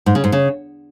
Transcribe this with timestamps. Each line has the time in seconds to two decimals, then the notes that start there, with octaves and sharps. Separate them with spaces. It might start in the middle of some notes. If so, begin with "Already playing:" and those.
0.06 G#2
0.15 C#3
0.24 G#2
0.32 C#3